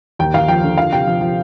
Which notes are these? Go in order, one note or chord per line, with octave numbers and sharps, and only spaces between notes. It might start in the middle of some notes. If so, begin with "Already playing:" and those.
D#2 G5
D#2 F5
F3 G5
D3
F3 F5
C3 G5
F3
F3